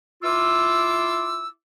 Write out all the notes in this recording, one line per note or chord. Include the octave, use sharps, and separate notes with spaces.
E4 F4 D6 E6